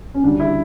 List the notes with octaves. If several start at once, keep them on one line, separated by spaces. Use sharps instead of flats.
C#4
D2 C#3 G3 D4
E4